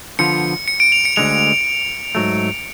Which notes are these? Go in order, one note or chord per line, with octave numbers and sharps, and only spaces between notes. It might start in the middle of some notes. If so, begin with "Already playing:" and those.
D3 F3 B3 F4 C#7
C#7
D7
F7
C#7
D2 D3 G#3 F7
G#2 F#3 A3